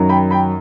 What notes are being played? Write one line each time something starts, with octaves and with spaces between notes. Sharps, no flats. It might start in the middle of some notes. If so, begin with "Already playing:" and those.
Already playing: F#2 D#3 F#3
G5 B5
G5 B5